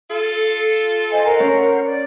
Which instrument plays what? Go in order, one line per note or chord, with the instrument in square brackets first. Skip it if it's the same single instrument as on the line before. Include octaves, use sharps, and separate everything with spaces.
[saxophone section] F4 A4
[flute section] C5 D#5 G#5
A#4 C5 F#5
[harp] C#4
[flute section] D5